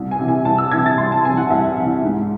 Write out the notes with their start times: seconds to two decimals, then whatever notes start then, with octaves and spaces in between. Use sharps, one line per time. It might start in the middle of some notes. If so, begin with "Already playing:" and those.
Already playing: C2
0.11 G#5
0.19 C3 E3
0.28 G#5
0.45 C2 A5
0.58 E6
0.71 C3 E3 G#6
0.86 A6
0.98 C2 C6
1.12 A5
1.25 C3 G#5
1.29 E3
1.37 F#5
1.50 C2 E5
1.77 C3 E3
2.04 G#2